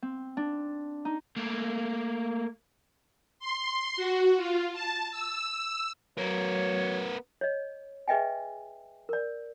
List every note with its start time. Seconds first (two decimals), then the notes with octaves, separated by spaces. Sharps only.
0.02 C4
0.37 D4
1.05 D#4
1.37 A3 A#3
3.39 C6
3.97 F#4
4.37 F4
4.73 A5
5.11 E6
6.18 F#3 B3 A#4 C#5
7.41 C#5 D#5
8.08 G#4 B4 D#5 E5 G5 G#5
9.09 A#4 D5